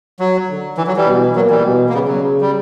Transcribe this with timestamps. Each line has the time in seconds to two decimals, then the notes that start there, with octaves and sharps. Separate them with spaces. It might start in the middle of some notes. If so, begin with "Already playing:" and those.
0.20 F#3
0.49 D3
0.78 E3
0.87 F#3
0.97 E3 G3
1.07 B2
1.35 A#2 F#3
1.50 E3 G3
1.64 B2
1.89 A#3
1.93 C#3 G3 B3
2.08 F#3
2.22 C#3
2.41 G3